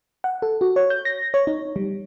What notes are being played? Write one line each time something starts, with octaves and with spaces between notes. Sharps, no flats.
F#5
A4
F#4
C#5
G6
A#6
C#5
D#4
G3